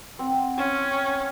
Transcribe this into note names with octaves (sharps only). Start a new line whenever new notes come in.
C4 F#5
C#4 C5